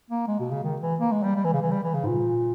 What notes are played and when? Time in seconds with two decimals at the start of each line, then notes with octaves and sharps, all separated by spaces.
0.10 A#3
0.27 G#3
0.40 B2
0.51 C#3
0.64 D#3
0.81 E3
1.00 A#3
1.11 G#3
1.23 G3
1.35 G3
1.44 E3
1.53 C#3
1.62 E3
1.71 G3
1.83 E3
1.94 C#3
2.03 G#2
2.06 A#2